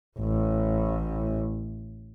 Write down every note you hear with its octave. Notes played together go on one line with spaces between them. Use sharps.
A1 A2